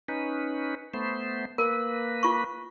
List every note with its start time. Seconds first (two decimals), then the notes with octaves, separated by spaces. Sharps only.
0.08 C#4 D#4 B4
0.94 A3 B3 C5
1.58 A#3 A#4 B4
2.23 F4 C#6